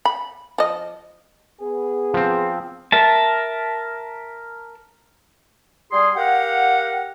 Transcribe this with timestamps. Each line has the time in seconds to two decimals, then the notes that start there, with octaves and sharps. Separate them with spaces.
0.05 B5
0.58 F3 D#5
1.60 B3 G#4
2.14 F3 C4
2.92 A#4 E5 A5
5.92 G3 G#4 C6
6.16 G4 A#4 F5 F#5